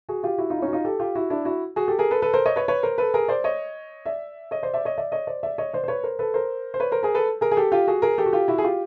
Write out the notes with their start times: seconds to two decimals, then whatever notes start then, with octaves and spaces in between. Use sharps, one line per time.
0.09 F#4 G#4
0.23 F4 G4
0.38 E4 F#4
0.50 D#4 F4
0.58 E4
0.62 C#4 D#4
0.68 F#4
0.73 D#4 F4
0.85 G4 A4
1.00 F4 G4
1.15 E4 F#4
1.30 D4 E4
1.45 E4 F#4
1.76 F#4 G#4
1.88 G4 A4
1.99 G#4 A#4
2.11 A4 B4
2.22 A4 B4
2.33 A#4 C5
2.46 C#5 D#5
2.56 B4 C#5
2.68 B4 C#5
2.83 A#4 C5
2.98 A4 B4
3.14 G#4 A#4
3.28 C5 D5
3.44 C#5 D#5
4.06 D5 E5
4.51 C#5 D#5
4.63 C5 D5
4.74 D5 E5
4.85 C#5 D#5
4.98 D5 E5
5.12 C#5 D#5
5.27 C5 D5
5.43 D5 E5
5.58 C#5 D#5
5.73 C5 D5
5.84 C5
5.88 B4 C#5
6.03 A#4 C5
6.19 A4 B4
6.34 A#4 C5
6.74 C5
6.80 B4 C#5
6.92 A#4 C5
7.03 G#4 A#4
7.15 A4 B4
7.41 G#4 A#4
7.52 G#4
7.57 G4 A4
7.72 F4 G4
7.87 F#4 G#4
8.02 G#4 A#4
8.18 G4 A4
8.26 F#4
8.33 F4 G4
8.48 E4 F#4
8.58 G#4
8.64 F4 G4